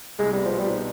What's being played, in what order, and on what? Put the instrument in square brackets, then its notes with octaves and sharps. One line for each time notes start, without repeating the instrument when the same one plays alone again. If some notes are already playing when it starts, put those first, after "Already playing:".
[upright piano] C2 [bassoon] G#3
[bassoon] G3 [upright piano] B3
[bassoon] F3
[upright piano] B2
[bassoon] G3
[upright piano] D#4